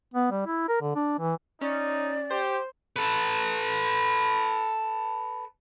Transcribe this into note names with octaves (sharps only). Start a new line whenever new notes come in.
B3
G3
E4
A#4
D3
D4
E3
C#4 D#4 D5
G4 C5
A4 B4